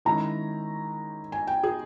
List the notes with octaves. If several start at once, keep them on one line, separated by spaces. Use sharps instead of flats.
D#3 G#3 C#4 E4 A#5
G#5
G5
G#4